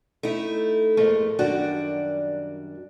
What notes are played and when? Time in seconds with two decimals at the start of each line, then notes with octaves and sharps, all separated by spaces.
0.23 A3 D#4 E4
0.97 F2 G#2 A3 A#3
1.39 F#2 D#3 G3 D4 F#4 D5